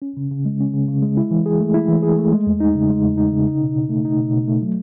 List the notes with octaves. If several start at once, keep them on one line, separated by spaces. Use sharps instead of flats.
C#4
C#3
C#3
G#3
C#4
C#3
C#3
G#3
E4
E3
G#4
A3
E4
E3
G#4
A3
G#3
E2
D#4
C#3
G#3
E2
D#4
C#3
D#4
B2
B2
A3
D#4
B2
B2
A3
F#3